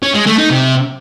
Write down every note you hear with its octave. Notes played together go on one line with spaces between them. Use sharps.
C#4
G#3
A3
D#4
C3